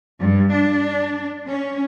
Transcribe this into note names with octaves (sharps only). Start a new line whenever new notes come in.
G2
D4
C#4